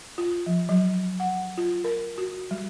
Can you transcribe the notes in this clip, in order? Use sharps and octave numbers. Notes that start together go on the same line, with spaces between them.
F4
F3
F#3
F#5
F4
A#4
F#4
G3